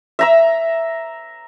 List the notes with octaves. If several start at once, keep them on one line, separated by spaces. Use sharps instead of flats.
E5 A#5 E6